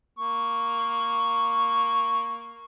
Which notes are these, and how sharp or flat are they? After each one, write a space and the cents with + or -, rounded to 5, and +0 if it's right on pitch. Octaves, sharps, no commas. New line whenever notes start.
A#3 +0 C#6 +0